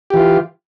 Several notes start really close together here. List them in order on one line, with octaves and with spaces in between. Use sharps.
G4 E3 F4